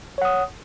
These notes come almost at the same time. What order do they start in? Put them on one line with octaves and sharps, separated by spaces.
C#5 F#5 D#6